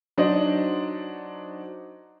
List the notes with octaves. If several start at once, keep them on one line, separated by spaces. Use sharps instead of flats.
F#3 D4 D#4 C5 D5 D#5